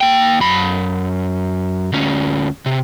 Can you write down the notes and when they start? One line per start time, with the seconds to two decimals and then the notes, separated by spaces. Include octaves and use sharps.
0.01 A#3 G5
0.40 F#2 B5
1.93 D2 C#4
2.66 C3